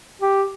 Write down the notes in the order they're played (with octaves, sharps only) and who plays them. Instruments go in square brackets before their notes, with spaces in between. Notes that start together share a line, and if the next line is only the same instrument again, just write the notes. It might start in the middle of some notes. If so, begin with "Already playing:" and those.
[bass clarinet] G4